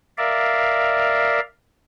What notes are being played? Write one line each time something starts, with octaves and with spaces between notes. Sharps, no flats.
A#4 D5 E5 F5